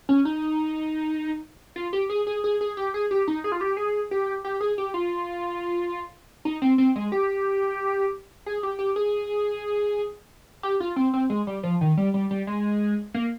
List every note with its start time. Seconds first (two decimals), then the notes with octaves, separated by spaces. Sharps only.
0.09 C#4
0.25 D#4
1.76 F4
1.93 G4
2.10 G#4
2.27 G#4
2.44 G#4
2.61 G#4
2.77 G4
2.94 G#4
3.11 G4
3.28 D#4
3.44 G#4
3.52 F4
3.61 G4
3.77 G#4
4.11 G4
4.44 G4
4.61 G#4
4.78 G4
4.94 F4
6.45 D#4
6.62 C4
6.78 C4
6.96 G#3
7.12 G4
8.46 G#4
8.63 G4
8.79 G4
8.96 G#4
10.63 G4
10.80 F4
10.96 C4
11.13 C4
11.30 G#3
11.47 G3
11.63 F3
11.81 D#3
11.97 G3
12.14 G3
12.31 G3
12.47 G#3
13.14 A#3